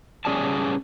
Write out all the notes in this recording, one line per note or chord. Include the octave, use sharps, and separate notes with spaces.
G3 C#4 G#4 D5 G#5 A5